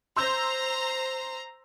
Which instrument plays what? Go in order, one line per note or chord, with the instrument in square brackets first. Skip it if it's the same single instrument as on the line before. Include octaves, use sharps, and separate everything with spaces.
[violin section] C5 A#5 [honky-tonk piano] C6 E6 G6